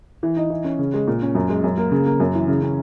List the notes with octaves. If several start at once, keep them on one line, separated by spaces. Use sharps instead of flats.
E3
D#4
E3
C#4
C#3
G#3
A#2
C#4
F#2
G#3
F#2
A#3
C#3
A#3
F#2
E3
C#3
C#4